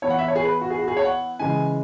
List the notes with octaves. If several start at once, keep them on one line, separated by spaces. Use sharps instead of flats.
E3 B3 E4 C#5
F#5
E5
C#5
G#4
B4
F#4
G#4
F#4
G#4
C#5
F#5
C#3 E3 G#3 G#5